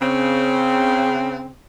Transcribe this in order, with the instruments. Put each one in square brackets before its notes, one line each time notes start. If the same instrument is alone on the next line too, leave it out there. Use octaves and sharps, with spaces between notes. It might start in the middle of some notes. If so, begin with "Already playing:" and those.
[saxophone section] C#3 C4